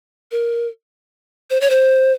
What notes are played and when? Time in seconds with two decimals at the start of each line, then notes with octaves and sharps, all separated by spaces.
0.32 A#4
1.50 C5
1.61 C#5
1.70 C5